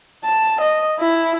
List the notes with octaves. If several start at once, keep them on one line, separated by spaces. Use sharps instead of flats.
A5
D#5
E4